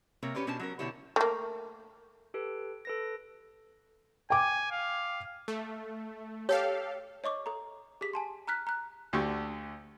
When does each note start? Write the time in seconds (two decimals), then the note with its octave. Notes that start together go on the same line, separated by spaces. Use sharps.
0.23 C3 A#3 A#4 C#5
0.35 C#4 G4 B4 C#5 D5
0.47 B2 C#4 D4 C5 A5
0.59 F#3 C#4 A#4
0.79 B2 D3 D4 E4 G4 C#5
1.16 A3 A#3
2.34 G4 A4 B4
2.85 A4 B4 A#6
4.30 G5 G#5 D6
4.71 F5
5.48 A3
6.49 G4 A4 C#5 F5
7.24 C#5 D#5 C#6 D6
7.46 A4 A#5
8.01 G4 G#4 B6
8.13 G#5 A5 C6
8.47 A#5 F6 F#6 B6
8.67 A#5 F#6
9.13 D2 D3 G4 C#6